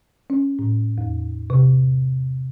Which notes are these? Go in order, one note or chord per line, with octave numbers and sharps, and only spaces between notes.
C#4
A2
E2
C3